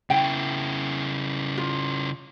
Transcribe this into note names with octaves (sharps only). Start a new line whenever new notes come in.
C#3 E4 G5
F4